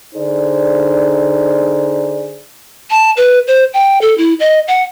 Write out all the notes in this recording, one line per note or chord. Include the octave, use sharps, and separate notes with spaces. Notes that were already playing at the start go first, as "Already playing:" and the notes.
D3 D#4 G#4 C5 D5
A5
B4
C5
G5
A4
E4
D#5
F#5